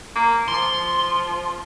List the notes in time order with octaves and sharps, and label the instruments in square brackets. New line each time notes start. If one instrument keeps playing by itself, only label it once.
[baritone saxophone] A#3
[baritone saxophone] F3 [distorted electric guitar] C6